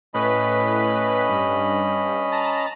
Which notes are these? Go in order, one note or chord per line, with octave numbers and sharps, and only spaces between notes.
A2 C#4 B4 D#5 B5 B6
G2
A5 A#5